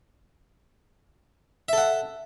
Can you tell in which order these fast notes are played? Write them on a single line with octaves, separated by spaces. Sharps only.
E5 A4 F#5